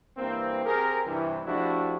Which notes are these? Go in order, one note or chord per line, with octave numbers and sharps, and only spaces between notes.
G2 E3 A#3 C4
C4 G4 G#4 A#4
G2 C3 E3
F3 A3 D4 E4 F#4 G4